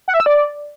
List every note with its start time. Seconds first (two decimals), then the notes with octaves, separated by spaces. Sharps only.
0.08 F#5
0.14 E5
0.20 E6
0.26 D5